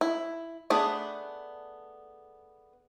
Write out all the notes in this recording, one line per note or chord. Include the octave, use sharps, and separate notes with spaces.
E4
A3 B3 D4 G#4